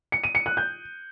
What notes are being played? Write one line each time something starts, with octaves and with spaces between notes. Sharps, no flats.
C#7
D#7
C#7
F#6
G6